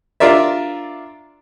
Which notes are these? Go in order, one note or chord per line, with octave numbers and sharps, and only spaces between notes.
D4 F4 A#4 D5 E5